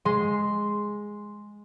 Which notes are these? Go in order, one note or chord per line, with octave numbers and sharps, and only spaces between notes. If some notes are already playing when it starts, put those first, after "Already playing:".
G#3 C6